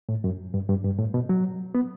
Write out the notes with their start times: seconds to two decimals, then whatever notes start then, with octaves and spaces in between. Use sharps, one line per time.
0.09 A2
0.24 F#2
0.54 G2
0.69 G2
0.84 G2
0.99 A2
1.14 B2
1.29 F#3
1.75 B3